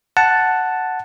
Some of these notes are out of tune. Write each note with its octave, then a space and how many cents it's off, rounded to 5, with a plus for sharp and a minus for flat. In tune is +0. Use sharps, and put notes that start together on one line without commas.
F#5 +0 A5 +0